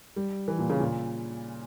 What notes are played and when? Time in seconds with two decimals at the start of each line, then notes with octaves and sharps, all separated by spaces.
0.16 G3
0.48 E3
0.59 A#2
0.70 C#3
0.80 A#2